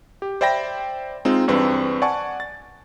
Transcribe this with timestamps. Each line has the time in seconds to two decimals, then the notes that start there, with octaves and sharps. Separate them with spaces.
0.22 G4
0.41 C5 D5 E5 G5 B5 A#6
1.25 G#3 C4 D#4 F4
1.48 E2 G2 C4 B4
2.02 D5 F#5 G#5 A5 C#6
2.40 A6